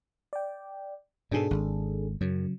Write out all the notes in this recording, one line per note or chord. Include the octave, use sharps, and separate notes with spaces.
D5 G5
G#2 B2 D4 G#4 A4
G#1
F#2 C#3 F#3